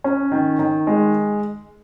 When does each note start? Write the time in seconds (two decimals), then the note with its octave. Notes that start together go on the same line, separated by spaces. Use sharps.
0.04 C#4
0.32 D#3
0.59 D#3
0.87 G#3